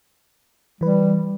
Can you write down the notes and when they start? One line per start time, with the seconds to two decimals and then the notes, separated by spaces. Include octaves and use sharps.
0.81 E3 G3 B4